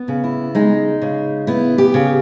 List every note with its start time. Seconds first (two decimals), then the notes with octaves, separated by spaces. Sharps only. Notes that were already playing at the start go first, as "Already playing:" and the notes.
Already playing: B3
0.08 C#3
0.24 E4
0.55 G#3 D#4
1.02 C#3
1.47 B3 E4
1.78 G4
1.94 C#3